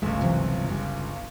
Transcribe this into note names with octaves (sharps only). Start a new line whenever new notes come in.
G1 C#2 G#3 A3
C3 E3 F#3
C#3 G3